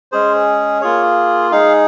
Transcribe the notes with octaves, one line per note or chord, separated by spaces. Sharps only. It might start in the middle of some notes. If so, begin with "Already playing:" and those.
G#3 C#4 G#4 C5
A#3 F4 G#4 C#5
G#3 D#4 G#4 F5